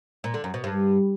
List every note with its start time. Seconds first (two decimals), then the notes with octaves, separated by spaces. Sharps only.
0.24 A#2
0.34 D3
0.44 F#2
0.54 B2
0.64 G2